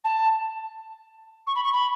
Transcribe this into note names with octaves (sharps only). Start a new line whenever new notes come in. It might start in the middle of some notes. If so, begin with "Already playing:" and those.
A5
C#6
B5
C#6
B5